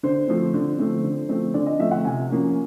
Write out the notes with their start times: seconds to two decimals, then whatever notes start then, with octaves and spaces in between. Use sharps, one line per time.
0.03 D3 C5
0.28 F3 A3 C4
0.54 D3
0.78 F3 A3 C4
1.03 D3
1.29 F3 A3 C4
1.54 D3 D5
1.66 D#5
1.79 F3 A3 C4 E5
1.91 F#5
2.05 C3 G#5
2.30 F3 A#3 C#4